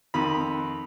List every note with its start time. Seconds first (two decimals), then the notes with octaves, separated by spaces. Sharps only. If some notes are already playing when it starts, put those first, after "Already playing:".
0.14 F2 D#3 B5